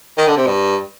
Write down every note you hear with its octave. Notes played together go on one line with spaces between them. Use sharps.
D#3
D3
C3
G2